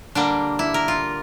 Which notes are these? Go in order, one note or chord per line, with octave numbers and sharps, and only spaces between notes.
D3 G3 A#3 D4
E4
A#4
F4